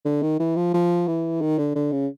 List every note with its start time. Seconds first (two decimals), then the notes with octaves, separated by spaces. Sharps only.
0.05 D3
0.22 D#3
0.40 E3
0.56 F3
0.74 F3
1.08 E3
1.42 D#3
1.59 D3
1.76 D3
1.92 C#3